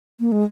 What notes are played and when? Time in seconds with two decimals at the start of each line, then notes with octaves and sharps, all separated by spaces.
0.20 A#3
0.32 G#3